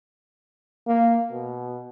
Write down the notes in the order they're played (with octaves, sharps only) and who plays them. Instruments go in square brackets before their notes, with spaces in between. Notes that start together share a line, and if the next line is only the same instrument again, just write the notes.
[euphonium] A#3
B2